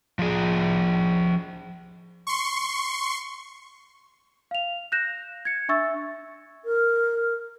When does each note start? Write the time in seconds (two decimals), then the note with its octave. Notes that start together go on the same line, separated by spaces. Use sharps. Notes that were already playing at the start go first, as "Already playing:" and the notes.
0.19 F3 G#4
2.27 C6 C#6
4.51 F5 F7
4.92 F#6 G6 A#6 E7
5.45 G#6 C#7
5.69 D4 E5 C#6 E6 A6
6.65 A#4